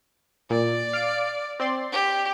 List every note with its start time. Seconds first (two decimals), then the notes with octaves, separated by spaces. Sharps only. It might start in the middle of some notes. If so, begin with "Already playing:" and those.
0.50 A#2 D5
0.93 F5 D6 D7
1.60 C4 D5 C6
1.92 G4